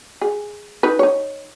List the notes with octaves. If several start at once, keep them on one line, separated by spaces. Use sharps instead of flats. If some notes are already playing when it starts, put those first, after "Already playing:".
G#4
D#4 B4
D#4 C#5